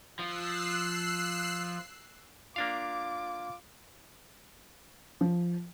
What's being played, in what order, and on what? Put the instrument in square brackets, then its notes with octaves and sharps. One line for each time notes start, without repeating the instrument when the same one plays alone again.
[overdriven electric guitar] F3 [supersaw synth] E6 F#6 C7
[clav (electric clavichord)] A#3 D4 F5 [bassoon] F4 [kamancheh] D6
[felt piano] F3